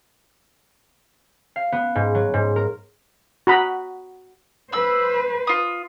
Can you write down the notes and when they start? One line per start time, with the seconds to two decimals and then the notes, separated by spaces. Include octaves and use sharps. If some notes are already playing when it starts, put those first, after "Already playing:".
1.56 F5
1.72 B3
1.95 G#2
2.15 F#3
2.34 G#2
2.56 A#4
3.47 F#4 A#5 B5 D#6
4.72 B4 C5 B5 E6
5.47 F4 D#6